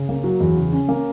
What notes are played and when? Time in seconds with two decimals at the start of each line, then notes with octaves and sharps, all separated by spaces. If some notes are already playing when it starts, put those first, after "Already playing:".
Already playing: C#3
0.09 A#3
0.24 F#3
0.41 E2
0.57 C#3
0.72 C#4
0.89 A#3